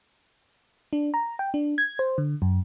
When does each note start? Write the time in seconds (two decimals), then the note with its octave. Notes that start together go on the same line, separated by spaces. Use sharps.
0.93 D4
1.14 A#5
1.39 G5
1.54 D4
1.78 G#6
1.99 C5
2.18 D3
2.42 F#2